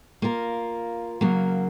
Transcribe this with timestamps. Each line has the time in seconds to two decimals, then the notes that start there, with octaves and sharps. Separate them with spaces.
0.22 A#3 F4 A#4
1.21 C#3 F#3 A#3